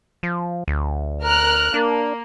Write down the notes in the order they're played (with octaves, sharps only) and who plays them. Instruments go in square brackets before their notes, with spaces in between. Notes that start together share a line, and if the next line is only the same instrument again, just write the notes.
[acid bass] F3
D2
[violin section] A#4 F6 F#6
[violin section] A#3 [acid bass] D4